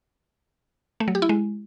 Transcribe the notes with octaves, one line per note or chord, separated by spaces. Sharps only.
A3
F#3
G4
E4
G#3